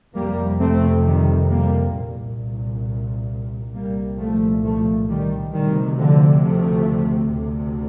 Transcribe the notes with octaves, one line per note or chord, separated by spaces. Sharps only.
F2 C3 G3 A#3
A3 C4
D#3 G3
G3 A#3
C2 A#2
C2 A#2 G3 A#3
F3 A3
F3 A3
D#3 G3
D2 C3 D#3 G3
D3 F3
F3 A3
D2 C3